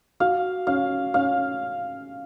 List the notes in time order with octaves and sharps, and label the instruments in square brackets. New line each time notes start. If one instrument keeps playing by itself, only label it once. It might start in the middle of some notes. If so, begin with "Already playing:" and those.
[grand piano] F#4 [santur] F5
[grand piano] C#4 [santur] F5
[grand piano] C#4 [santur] F5